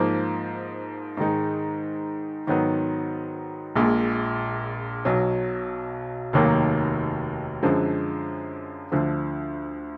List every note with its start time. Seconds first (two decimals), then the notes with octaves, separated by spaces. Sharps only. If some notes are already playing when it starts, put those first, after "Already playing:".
Already playing: G#2 F3 A#3
1.17 G#2 D#3 G#3 D#4
2.47 G#2 D#3 F#3 B3
3.75 A#1 A#2 G#3
5.05 B1 B2 F#3
6.33 F1 D#2 D#3 F#3 A#3
7.63 F#2 D3 F3 G#3
8.92 D2 D3 F3